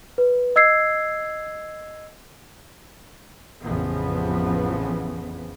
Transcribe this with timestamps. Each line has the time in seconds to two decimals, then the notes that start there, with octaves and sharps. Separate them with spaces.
0.18 B4
0.56 D#5 E6 G#6 C7
3.63 A1 F2 C#3 E3 F3 B3